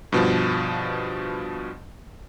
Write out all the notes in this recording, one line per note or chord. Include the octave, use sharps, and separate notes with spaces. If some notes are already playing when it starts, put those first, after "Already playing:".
G2 B2 F3